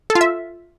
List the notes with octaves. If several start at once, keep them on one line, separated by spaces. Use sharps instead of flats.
A4
F4
E5